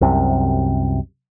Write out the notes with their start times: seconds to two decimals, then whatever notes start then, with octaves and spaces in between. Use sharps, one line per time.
0.01 C2 F#2 C3